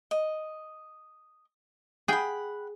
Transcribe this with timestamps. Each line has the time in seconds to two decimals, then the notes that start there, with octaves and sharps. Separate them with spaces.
0.11 D#5
2.08 G#4 F#5 G5 B5